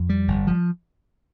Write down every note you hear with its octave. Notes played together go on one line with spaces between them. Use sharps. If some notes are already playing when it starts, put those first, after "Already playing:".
Already playing: F2
G3
G1
F3